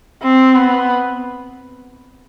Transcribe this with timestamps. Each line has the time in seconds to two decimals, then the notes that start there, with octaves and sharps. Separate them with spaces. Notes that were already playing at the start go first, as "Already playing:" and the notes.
0.23 C4
0.55 B3